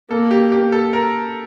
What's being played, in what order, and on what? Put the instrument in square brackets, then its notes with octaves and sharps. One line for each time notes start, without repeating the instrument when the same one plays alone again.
[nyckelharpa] A#3 [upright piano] A4
[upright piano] G4
G4
A4
A#4